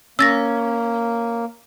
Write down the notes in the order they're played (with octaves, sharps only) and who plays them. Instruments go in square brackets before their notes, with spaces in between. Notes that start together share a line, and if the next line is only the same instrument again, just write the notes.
[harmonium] A#3 [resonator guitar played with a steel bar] C#4 [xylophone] E6 A6 A#6